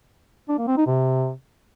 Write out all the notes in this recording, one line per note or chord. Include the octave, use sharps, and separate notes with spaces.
D4
A#3
C4
D#4
C3